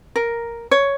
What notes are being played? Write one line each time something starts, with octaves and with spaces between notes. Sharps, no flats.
A#4
C#5